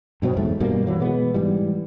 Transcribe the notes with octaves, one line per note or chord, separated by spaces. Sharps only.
G2 B2 F#3 C4
E2 G#2 A3
G2 B2 G3 A#3
E3 F#3
B2 G#3 B3
G#2 E3 G3